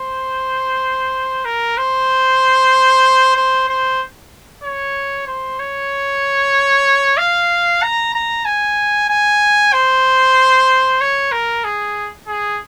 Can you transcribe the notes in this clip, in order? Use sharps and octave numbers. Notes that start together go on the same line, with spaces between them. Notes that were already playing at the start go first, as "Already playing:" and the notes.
Already playing: C5
A#4
C5
C5
C5
C#5
C5
C#5
F5
A#5
A#5
G#5
G#5
C5
C#5
A#4
G#4
G#4